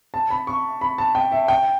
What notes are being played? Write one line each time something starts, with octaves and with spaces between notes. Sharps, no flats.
A5
B5
C#6
B5
A5
G5
E5
G5